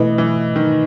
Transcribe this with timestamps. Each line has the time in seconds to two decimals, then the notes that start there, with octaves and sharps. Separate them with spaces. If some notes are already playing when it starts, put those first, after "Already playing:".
Already playing: B2 E3 A3 E4 B4 D#5
0.18 E3
0.56 D#3